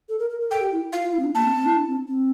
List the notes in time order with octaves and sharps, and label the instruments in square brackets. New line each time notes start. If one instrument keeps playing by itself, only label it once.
[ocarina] A4
A#4
A#4
A#4
[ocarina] A4 [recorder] G5
[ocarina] G4
E4
[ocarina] F4 [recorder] F5
[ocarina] F4
E4
C4
D4
[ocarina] A#3 [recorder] A5
[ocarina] C4
C4
E4
D4
C4
C4